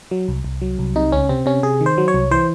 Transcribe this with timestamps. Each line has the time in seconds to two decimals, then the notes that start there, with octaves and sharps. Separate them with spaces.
0.11 F#3
0.28 C2
0.44 C2
0.61 F#3
0.79 C2
0.96 C3 D#4
1.12 C#2 C#4
1.29 C3 C4
1.46 C3 C#4
1.63 C3 G#4
1.81 D#3
1.86 C5
1.98 F#3
2.08 C#5
2.14 C2
2.31 E3 C5